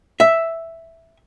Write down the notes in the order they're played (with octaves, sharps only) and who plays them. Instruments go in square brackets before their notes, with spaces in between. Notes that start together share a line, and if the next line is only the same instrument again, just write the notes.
[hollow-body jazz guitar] E5